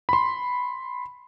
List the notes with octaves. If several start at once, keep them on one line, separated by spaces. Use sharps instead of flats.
B5 C6